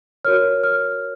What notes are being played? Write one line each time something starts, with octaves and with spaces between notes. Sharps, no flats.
F#4 A#4 C#5 F6
F6